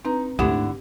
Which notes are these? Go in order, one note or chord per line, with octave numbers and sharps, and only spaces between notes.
C4 D#4 B4 A#5
D2 G#2 D3 E4 G4 F#5